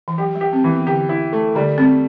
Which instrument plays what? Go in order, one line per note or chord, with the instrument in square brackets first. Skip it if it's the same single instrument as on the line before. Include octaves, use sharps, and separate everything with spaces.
[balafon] E3
[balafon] F#3 [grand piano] G4
[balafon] G3
[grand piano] G4
[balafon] C4
[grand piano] E3
[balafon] B3
[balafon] D3 [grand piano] G4
[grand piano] E4
A3
[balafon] D3 [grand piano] G3
[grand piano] G3 [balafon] C4